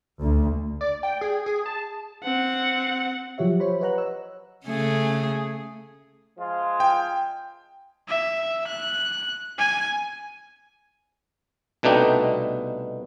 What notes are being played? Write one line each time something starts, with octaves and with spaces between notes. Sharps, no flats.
D2
D5
G5
G#4
G#4
A5
C4 F#5
F3 F#3 G4 C#5 E5
C5 C#5 B5
B4 C#5 D#5 F#5 A#5 F#6
C#5 E6
C#3 A3 G#4
F3 G#3 F4
G5
E5
F#6
G#5
C2 B2 A3 D4 D#4 G5